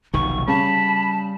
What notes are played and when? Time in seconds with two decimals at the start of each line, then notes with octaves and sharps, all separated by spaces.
0.14 F1 B1 D#3 C#6
0.48 C#3 G3 A5 B5